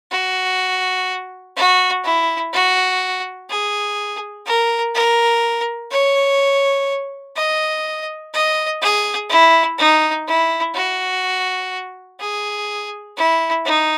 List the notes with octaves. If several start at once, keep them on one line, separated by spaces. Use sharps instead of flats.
F#4
F#4
E4
F#4
G#4
A#4
A#4
C#5
D#5
D#5
G#4
E4
D#4
E4
F#4
G#4
E4
D#4